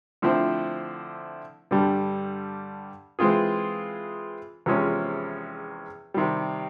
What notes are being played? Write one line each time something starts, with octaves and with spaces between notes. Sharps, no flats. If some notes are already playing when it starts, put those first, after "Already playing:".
D3 F3 A3 C4 E4
G2 D3 G3
E3 G#3 C4 F4 G#4
E2 C3 F3 G#3 C#4
C3 D#3 G3